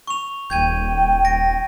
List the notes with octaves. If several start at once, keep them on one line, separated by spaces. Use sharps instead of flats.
C#6 F7
D#1 G5 G6 G#6 D#7
A#6 D7